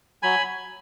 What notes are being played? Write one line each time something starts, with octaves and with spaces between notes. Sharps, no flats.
F#3 G#5 B5